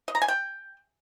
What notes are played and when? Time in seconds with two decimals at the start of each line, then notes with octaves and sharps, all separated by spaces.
0.08 D#5
0.15 A#5
0.22 G#5
0.28 G5